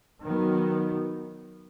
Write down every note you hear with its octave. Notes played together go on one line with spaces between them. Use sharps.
D#3 F#3 B3